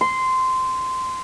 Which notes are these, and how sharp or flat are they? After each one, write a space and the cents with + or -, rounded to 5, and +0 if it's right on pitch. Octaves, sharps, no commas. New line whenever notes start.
C6 -15